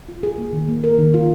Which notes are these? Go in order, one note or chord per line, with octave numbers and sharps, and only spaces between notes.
F4
G#4
A#3
D#3
A#3
A#4
D#3
F4